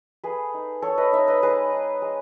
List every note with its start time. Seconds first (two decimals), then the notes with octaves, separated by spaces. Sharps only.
0.24 A3 G#4 B4
0.54 D#4
0.82 A3 A4 C#5
0.98 B4 D#5
1.12 D#4 C#5 E5
1.28 B4 D#5
1.42 G#3 G#4 B4
1.72 D#4
2.02 G#3